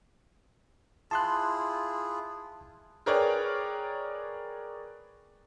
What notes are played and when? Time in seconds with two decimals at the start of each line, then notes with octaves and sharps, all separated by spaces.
1.11 E4 F4 G#4 A5 C6 F#6
3.06 G#4 A#4 B4 C#5 D5 G5